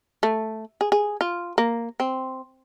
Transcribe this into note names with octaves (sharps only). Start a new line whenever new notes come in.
A3
G#4
G#4
F4
A#3
C4